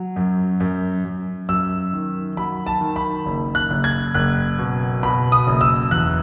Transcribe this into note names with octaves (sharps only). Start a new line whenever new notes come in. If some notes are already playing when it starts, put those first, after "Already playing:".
Already playing: F#3
F#2
F#2
F#2
F#2 E6
D#3
F#3 B5
A5
D#3
B5
F#1
F#6
F#1
G#6
F#1 F#6
B2
B2 B5
D#6
F#1
E6
E2 F#6